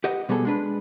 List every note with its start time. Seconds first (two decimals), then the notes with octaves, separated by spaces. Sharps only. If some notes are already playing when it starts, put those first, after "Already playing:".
0.04 G4 B4 D#5 F#5
0.29 B2 G3 B3 G#4 A4
0.45 G#3 D4 B4